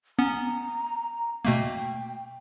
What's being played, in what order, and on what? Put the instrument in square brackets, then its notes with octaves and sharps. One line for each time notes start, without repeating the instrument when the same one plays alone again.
[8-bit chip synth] B3 C#4 [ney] A#5
[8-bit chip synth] B2 A3 A#3 [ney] G5